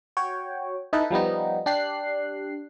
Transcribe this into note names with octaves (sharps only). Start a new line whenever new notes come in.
F#4 C#5 G5
D#4 E4 A4 B4
F3 G3 B3 D#4
D4 G4 F#6 C7